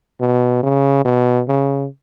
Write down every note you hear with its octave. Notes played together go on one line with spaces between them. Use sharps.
B2
C#3
B2
C#3